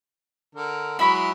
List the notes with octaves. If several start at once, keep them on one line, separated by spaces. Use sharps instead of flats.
D3 A#4
F#3 G#3 E4 B5